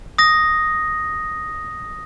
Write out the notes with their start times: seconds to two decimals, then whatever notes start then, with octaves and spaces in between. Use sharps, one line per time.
0.18 D#6 A#6